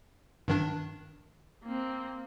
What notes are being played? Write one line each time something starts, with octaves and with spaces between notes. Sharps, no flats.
G2 D#3 D4
A#3 C4